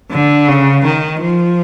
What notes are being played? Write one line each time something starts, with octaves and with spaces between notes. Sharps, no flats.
D3
C#3
D#3
F3